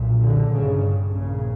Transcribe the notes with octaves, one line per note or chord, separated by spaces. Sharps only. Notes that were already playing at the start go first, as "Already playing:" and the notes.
Already playing: B1 A#2
D3
G1 G2 C#3
A#1 A#2 C#3